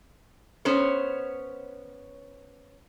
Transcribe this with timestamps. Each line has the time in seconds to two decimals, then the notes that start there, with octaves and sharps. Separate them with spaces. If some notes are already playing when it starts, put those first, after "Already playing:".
0.65 B3 C#4 C5 C#5